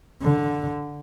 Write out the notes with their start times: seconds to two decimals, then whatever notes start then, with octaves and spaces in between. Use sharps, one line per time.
0.22 D3